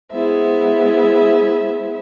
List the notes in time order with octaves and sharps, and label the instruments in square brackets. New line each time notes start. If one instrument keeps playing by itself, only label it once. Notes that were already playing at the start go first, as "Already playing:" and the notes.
[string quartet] G#3 B3 E4 G#4 C5 E5